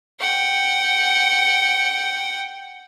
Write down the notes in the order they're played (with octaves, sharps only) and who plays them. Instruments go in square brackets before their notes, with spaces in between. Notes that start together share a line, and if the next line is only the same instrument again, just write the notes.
[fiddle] F#5 G5